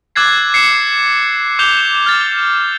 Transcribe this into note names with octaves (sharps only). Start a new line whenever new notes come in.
D6 E6 F#6 G#6 A6 C7
C7 C#7 E7
D6 G6 F7 G7
F6 A6